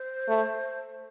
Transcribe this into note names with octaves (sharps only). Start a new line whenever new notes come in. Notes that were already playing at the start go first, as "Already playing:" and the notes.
Already playing: C5
A3